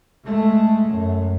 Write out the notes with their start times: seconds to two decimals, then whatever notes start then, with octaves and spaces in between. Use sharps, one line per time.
0.24 G#3 A3
0.87 F#2